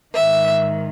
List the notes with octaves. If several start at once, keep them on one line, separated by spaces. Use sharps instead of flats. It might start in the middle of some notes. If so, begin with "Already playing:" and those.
G#2 D#3 E5